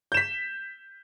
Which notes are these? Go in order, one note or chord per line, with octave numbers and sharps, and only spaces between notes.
G6 B6 E7